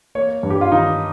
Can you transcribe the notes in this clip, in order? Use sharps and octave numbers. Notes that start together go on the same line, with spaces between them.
A#3 C#5
G2
G4
F4
D#3 D#4